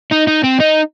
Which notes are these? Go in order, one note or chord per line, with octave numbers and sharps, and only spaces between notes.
D#4
D#4
C4
D#4